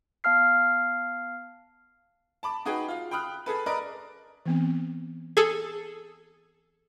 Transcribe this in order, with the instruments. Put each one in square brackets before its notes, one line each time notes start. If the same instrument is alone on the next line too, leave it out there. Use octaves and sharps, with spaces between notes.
[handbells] B3 F5 A5 F6 C7
[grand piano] A5 B5 D6
D#4 F#4 G#4 B4 G5
F4 F5
G5 B5 D#6 F6 F#6
G#4 A4 B4
A#4 B4 D5 D#5
[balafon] E3 B3 C4
[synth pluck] G#4 A4